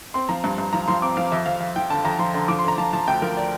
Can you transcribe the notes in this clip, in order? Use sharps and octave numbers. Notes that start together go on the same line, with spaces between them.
C4 C6
F3 A#5
G2
G2
F3 A#5
F3 C6
C4 D6
F3 F5
F2 E5
F2 F5
F2 F5
F3 G5
D3 A5
F2 A#5
F3 C6
D3 C6
F3 D6
C6
D3 A#5
F3 A5
F3 A5
D2 G5
F3 A#4
D5